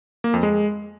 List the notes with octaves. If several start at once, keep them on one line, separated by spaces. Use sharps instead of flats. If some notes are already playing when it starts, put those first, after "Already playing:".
A#3
F2
G#3